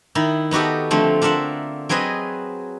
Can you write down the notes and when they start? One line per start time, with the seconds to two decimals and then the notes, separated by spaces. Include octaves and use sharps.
0.15 D#3 D#4 E4
0.51 B3 D#4 F#4 G4 A4
0.91 D3 F3 A3 C4
1.22 D4 F4 A#4 E5 F#5
1.89 F#3 C4 G#4 B4 D#5